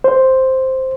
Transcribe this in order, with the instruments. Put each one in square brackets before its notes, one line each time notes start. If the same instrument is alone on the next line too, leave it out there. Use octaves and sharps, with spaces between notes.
[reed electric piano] C5